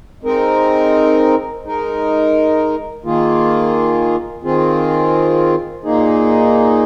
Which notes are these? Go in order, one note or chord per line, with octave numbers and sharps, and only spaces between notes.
G#3 C4 D#4 A#4
G#3 D#4 A#4
D#3 A#3 F4 G#4
D#3 C4 F4 G#4
A#2 A#3 D#4 G#4